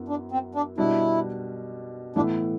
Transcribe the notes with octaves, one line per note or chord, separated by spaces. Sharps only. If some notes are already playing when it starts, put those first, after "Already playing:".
Already playing: F#2 F#3 B3 E4
D4
C4
D4
B2 G3 D4 E4
A2 E3 B3 D4 E4